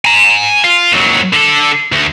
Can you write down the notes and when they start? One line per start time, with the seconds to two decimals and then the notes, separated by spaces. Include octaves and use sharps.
0.05 G#5 A#5
0.64 F4
0.92 D#2 F#3
1.33 D3 A4
1.92 D2